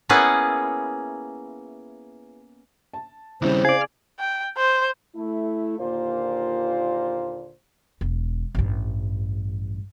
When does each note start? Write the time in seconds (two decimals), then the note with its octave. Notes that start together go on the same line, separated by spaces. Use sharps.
0.09 A#3 B3 C#4 E4 G#4 B4
2.93 A5
3.42 D#2 C#3 G3 C4 E4 C5
3.65 G#4 D5 F5
4.19 G5
4.57 C5
5.15 A3 E4
5.78 D#2 A#2 D3 A#3 F4 C5
8.01 E1
8.55 A1 G2